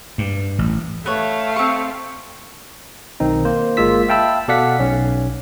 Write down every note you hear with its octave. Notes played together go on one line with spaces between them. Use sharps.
G2
A1
A3 B3 C#5 F5
C4 C#6
B1 D#3 C4 D#4
A#3 C5
G1 G#3 A#3 F4 E6 B6
E5 F5 G5 A5 B5 E6
B2 A4 D5 F5 F#5 B6
B1 C#4